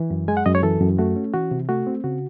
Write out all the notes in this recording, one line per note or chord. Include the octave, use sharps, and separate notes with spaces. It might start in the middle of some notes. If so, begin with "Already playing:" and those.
Already playing: E3
F#2
G#3 G#5
F#5
F#2 D#5
C#5
E3 A4
F#2
A3 F#4
C#4
E3 F#4
C3
A3 F#4
C4
C#3 F#4